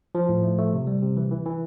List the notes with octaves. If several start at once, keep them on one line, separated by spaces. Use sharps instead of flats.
F3
A2
A3
A3
C3
G3
C3
E3
E3
E3